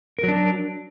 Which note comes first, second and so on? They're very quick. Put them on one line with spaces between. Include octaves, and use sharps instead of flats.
A#4 F#3 D4